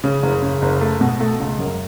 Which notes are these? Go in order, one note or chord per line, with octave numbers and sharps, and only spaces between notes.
C#3
F#1
C#3
F#1
A3
B2
A3
C#2
F#2